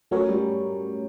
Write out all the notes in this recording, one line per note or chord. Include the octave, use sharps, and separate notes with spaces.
F#3 A3 C#4 F#4 A#4 C#5
G3